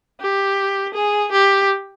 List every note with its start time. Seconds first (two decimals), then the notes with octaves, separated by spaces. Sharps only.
0.20 G4
0.94 G#4
1.31 G4